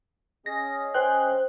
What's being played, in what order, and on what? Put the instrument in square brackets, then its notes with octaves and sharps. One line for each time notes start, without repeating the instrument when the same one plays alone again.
[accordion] C#4 G#4 D#5 [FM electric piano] A#6
[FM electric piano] C5 G5 F#6